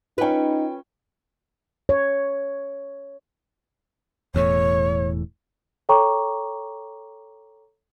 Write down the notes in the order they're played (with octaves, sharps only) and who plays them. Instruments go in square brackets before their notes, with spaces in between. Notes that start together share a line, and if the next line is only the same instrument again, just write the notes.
[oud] C#4 B4 [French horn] D#4 [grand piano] F4 G5
[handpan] C#5
[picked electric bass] E1 E2 A2 [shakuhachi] C#5
[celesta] A4 C#5 G5 A#5 C#6 D6